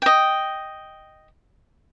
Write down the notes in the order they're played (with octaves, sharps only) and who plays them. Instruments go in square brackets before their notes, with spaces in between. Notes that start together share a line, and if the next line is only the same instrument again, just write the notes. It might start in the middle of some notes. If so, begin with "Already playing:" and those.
[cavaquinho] D#5 G5